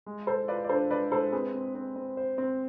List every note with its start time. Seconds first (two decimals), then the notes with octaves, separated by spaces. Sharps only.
0.06 G#3
0.27 G#3 A4 C5
0.48 F4 B4 D5
0.64 D5
0.69 D4 A4 C5
0.90 G#3 B4 D5
1.12 G#3 A4 C5
1.32 C4 G#4 B4
1.54 C4
1.75 C4
1.96 C4
2.17 C5
2.38 C4